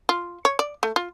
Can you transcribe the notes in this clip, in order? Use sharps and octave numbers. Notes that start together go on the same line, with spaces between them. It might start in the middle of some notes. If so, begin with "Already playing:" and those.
F4
C#5
D5
A3
F4